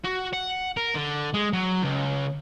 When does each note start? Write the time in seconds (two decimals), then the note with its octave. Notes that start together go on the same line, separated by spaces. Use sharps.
0.05 F#4
0.33 F#5
0.77 A#4
0.95 D3
1.34 G#3
1.53 F#3
1.82 C#2